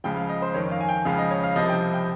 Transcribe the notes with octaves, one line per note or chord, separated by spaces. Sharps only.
C#2 C#3 F3 G5
F5
D#5
C5
F2 D#3 C#5
F5
G#5
G5
C#2 C#3 F3 F5
D#5
C#5
F5
C2 C3 F3 D#5
G5
G5